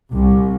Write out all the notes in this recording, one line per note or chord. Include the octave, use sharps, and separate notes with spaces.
C2